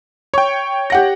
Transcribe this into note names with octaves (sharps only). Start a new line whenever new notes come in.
C#5 G5 C#6
G4 F#5 A#6